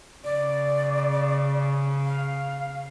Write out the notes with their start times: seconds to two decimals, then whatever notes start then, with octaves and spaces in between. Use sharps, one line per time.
0.24 C#3 D5
2.05 F5